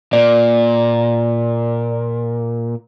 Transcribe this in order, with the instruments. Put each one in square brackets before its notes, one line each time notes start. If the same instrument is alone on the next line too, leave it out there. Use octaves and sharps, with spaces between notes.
[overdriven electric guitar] A#2 [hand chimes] D5